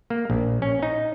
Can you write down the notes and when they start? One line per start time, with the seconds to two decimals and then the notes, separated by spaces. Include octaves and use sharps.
0.10 A#3
0.30 A#1
0.62 C#4
0.82 D#4